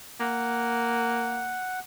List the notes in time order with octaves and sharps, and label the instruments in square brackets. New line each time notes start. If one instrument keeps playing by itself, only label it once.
[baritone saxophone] A#3 [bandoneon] F#5